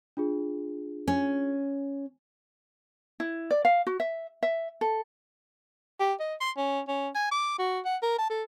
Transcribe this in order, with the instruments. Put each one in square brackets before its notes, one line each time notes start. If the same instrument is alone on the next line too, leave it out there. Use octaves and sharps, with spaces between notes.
[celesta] D4 F4 G#4
[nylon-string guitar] C#4
[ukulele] E4
D5
F5
F#4
E5
E5
A4
[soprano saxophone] G4
D#5
C6
C#4
C#4
G#5
D6
F#4
F#5
A#4
A5
A4